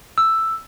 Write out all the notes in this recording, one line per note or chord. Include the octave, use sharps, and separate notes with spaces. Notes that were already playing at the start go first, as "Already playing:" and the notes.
E6